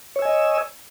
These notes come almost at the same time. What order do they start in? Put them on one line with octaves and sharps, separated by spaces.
C#5 E6 G#5 D#5